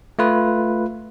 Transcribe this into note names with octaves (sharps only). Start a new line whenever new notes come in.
A3 F4 B4